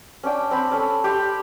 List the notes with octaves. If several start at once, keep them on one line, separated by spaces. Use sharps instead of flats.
C#4 D4 G5
C4 B5
C#4 A4
G4 G5 B5 C6